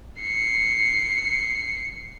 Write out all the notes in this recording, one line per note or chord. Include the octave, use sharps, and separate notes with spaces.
C7 C#7